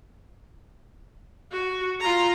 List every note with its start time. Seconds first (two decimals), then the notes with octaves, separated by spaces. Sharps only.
1.52 F#4
2.01 F4 A#5